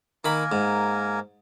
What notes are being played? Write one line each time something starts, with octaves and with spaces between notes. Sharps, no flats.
D#3 A#3 A#4 G#5 B5
G#2